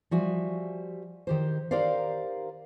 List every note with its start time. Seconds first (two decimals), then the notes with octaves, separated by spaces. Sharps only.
0.11 F3 G3 F#4 E5 G#5
1.27 D#3 G4 C5
1.71 D#4 G4 A#4 C5 D5 F5